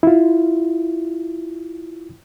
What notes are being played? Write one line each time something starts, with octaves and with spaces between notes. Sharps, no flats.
E4 F4